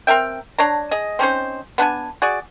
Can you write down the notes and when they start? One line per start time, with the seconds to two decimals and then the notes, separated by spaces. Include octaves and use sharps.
0.07 C4 A#4 E5 G5
0.58 D4 C#5 A#5
0.91 G#4 D#5
1.19 C4 C#4 D#4 C5
1.78 B3 D4 B4 G#5
2.22 F#4 G#4 D5